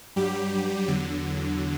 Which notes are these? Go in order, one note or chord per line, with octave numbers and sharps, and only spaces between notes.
G2 F#3 G3 G4
E2 D3 F#3